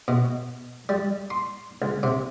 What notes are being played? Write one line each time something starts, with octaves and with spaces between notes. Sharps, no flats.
B2
G3
C6
C#2
C3